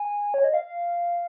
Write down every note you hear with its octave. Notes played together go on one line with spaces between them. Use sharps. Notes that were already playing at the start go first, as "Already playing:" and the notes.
Already playing: G#5
C#5
D#5
F5